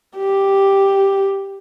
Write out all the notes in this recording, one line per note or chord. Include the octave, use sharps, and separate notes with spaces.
G4